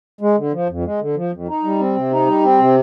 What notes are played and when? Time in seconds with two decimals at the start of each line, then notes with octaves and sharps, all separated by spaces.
0.21 G#3
0.37 D3
0.53 F3
0.69 F2
0.85 G#3
1.00 D3
1.16 F3
1.32 F2
1.48 D#4
1.64 G3
1.79 C4
1.96 C3
2.11 D#4
2.27 G3
2.43 C4
2.59 C3